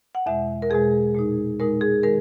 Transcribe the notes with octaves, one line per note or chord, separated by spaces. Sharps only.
F#5
E2 B2 G#3 E5
A#4
E2 B2 G#3 G#4
A#2 G#3 D#4
A#2 G#3 D#4 A#4
G#4
D#3 G#3 A#4